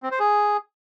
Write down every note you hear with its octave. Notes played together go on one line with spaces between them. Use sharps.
C4
C5
G#4